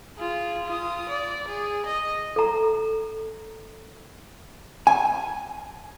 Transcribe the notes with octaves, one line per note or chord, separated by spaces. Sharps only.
F4 G#4
F4 D#6
D5
G#4
D#5
A4 A#5
G#5